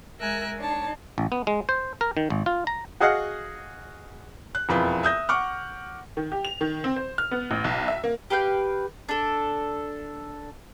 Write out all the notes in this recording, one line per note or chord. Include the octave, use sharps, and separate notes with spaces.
G#3 A#4 E5 G#5 E6 F#6
D4 D#4 C#5 A5
A1
B3
G#3
C5
A#4
D#3
G#1
F4
A#5
F#4 G#4 D#5 F5 F#5
F#6
E1 F2 E4 F4 B4
E5 D#6 G6 A#6
F#5 C#6 D6 F6
D#3
G4
F7
D#3
C4
C5
F6
B3
A1
B1
E5
A#3
G4 B4 F5 G5
D4 A4